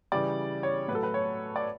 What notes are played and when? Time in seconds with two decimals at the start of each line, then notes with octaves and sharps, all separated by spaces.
0.12 C#3 E3 G3 D5
0.63 C#5
0.88 A2 B4
0.92 F#3 A4
1.03 B4
1.14 C#5
1.56 D5